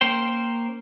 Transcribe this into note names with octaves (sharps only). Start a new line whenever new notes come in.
A#3 C#4 C5 G5